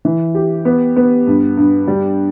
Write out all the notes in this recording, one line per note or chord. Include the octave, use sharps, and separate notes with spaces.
E3
G4
B3
B3
G2
G2
G3